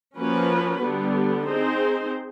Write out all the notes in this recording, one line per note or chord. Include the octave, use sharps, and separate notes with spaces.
F3 A#3 C#4 F#4 B4
D3 G3 B3
C4 D#4 G#4 C5